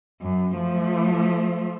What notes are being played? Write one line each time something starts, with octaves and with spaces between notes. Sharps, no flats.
F#2
F3 A3